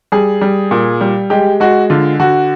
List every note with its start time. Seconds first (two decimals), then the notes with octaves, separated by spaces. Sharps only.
0.12 G3 G#4
0.41 G3
0.71 A#2
1.01 G3
1.30 G#3 G4
1.60 G#3 F#4
1.90 D3 F4
2.20 D3 F#4